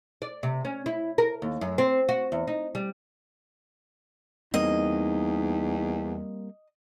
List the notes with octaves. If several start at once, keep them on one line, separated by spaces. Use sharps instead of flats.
D5
C3
C#4
E4
A#4
D#2
F#2
C4
F#4
E2
D#4
G3
E2 G3 A#3 C4 D#4 D#5